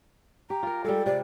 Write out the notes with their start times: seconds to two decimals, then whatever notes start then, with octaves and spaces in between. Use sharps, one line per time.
0.50 G4 A#5
0.63 F4 A#4
0.84 G3 G#3 A4
1.06 C3 D5